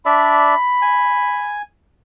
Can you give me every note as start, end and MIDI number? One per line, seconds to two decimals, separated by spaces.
0.06 0.55 62
0.06 0.55 74
0.06 0.55 76
0.06 1.57 83
0.82 1.62 80